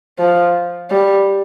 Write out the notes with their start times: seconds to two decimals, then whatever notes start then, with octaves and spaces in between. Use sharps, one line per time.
0.19 F3
0.90 G3